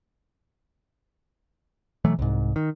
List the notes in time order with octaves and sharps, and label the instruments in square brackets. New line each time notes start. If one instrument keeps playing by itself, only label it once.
[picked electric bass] B2 E3 F#3 A3
C2 G#2
D#3